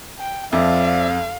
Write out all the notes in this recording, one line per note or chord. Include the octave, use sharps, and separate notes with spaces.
G5
F2 F3 D5 E5 F5